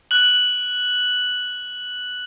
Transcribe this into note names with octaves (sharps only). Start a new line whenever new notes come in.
F#6 F#7